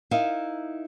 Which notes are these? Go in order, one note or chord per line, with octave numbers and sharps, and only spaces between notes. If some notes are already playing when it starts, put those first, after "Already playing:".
D#4 E4 A#4 E5 F5